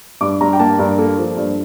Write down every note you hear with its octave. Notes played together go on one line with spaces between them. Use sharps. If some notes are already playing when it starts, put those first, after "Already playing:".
G2 D6
G2 A#5
G5
A#3 A5
G2 A#4
A#3 A4
F3
G2